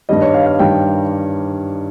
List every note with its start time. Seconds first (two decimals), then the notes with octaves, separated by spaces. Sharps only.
0.09 G2 D#3 G3 D#5
0.22 C#5
0.34 F5
0.46 F5
0.59 G2 D#3 G3 G5